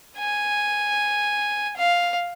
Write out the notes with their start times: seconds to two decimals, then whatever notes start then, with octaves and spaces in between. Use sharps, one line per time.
0.18 G#5
1.77 F5